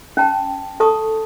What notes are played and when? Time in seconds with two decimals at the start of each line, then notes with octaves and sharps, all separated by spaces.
0.17 C#4 G5 A5
0.80 A4 A5 C#6 D#6